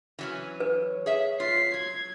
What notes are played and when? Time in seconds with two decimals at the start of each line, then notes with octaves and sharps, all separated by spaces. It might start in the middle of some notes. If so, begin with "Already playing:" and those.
0.19 E3 F#3 C#4
0.60 B4 C#5
1.06 G#4 E5
1.40 F4 B6 C7
1.74 F#3 G#6